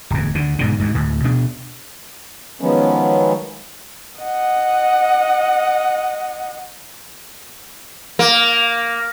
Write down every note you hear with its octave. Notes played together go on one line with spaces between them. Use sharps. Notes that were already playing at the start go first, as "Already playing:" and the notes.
D1 E2
D2 D3
G#2 B2 D3
D2 G#2
D2 A2
B2 D4
D#3 F3 F#3 G#3 B3 C#4
D#5 F#5
A#3